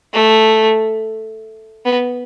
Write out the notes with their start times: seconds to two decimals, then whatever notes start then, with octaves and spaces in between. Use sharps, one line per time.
0.13 A3
1.85 B3